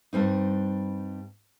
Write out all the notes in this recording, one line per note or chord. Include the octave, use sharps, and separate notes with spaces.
G2 G3 C4 D#4